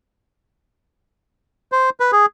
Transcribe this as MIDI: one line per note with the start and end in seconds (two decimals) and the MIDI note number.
1.72 1.90 72
2.00 2.11 71
2.12 2.26 68